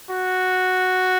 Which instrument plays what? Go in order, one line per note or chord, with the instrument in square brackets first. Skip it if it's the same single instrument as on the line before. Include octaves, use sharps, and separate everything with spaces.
[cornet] F#4